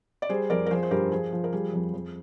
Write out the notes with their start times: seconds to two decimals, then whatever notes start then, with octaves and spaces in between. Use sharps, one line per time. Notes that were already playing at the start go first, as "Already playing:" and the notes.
0.22 D5
0.29 G3 G#4 C5
0.50 F2 A#4 D5
0.66 A#4
0.70 F3 G#4 C5
0.83 C5
0.91 G2 G4 A#4
1.11 F3 G#4
1.32 F3
1.44 A#4
1.53 G3 G#4
1.73 F2
1.94 F2